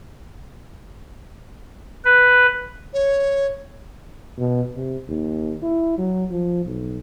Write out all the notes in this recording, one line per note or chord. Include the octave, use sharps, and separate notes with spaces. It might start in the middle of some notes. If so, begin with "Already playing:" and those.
B4
C#5
B2
C3
D#2
E4
F#3
F3
B1